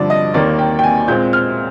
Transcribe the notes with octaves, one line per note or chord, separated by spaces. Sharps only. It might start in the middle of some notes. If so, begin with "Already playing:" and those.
Already playing: G2 D3 F3 D5
D#5
D#2 D#3 A#3 D5
G5
G5
G#5
A#2 G#3 C4 G6
F6